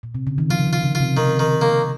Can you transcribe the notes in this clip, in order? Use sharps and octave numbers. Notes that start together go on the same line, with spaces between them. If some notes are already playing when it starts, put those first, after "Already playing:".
A#2
C3
C#3
D#3
F3 F4
C#3
D#3
F4
C#3
F4
C3
C3 D#3
D#3
A#3